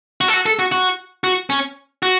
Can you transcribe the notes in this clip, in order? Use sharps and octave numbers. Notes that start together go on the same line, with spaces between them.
F#4
A4
F#4
A4
F#4
F#4
F#4
C#4
F#4